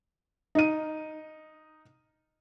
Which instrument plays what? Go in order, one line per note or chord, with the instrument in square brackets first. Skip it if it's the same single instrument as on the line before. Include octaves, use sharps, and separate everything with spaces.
[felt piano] D#4 D#7